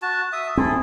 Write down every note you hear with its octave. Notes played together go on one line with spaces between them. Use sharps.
F#4 A5
E5 D#6
C4 E4 G#4 A4